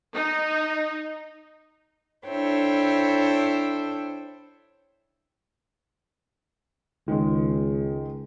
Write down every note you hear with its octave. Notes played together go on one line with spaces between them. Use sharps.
D#4
D4 E4 A4 C5 C#5 G5
C#2 D#3 G#3